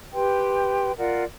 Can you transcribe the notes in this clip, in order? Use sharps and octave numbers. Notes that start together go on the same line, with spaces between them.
G4 B4 G5 C6
F4 A#4 D5 F#5